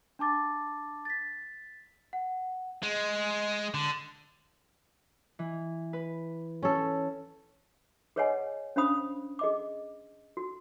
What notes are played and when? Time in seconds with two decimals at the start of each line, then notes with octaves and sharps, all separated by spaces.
0.19 D4 A5 D6 A6
1.05 A6 B6
2.13 F#5
2.83 G#3
3.74 D3
5.39 E3
5.93 B4
6.63 C#4 A4
8.16 G#4 B4 C#5 D#5 F#5 G#5
8.76 C#4 D4 C5 F5 B5 D#6
9.39 G#4 D#5 D6
10.37 F#4